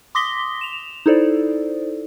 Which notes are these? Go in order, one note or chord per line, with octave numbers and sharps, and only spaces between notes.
C6 D6 D#6 A#6 B6 G7
E7 F7
D#4 E4 A4 C5 D5